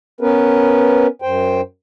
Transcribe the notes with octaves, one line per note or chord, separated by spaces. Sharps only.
B3 C#4 A#4 B4
F#2 C5 G5